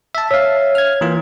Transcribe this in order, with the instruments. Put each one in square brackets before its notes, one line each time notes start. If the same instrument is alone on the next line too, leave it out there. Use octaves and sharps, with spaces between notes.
[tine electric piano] E5 A5
[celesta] C#5 [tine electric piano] E5 F5
[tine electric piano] F6 G#6
E3 A#3 F4